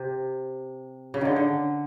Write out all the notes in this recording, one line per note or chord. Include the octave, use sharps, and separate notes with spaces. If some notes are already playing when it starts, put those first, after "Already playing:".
Already playing: C3
C#3
D3 D#3
D3